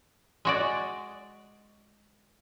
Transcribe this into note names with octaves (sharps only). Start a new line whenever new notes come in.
G#3 F#4 D5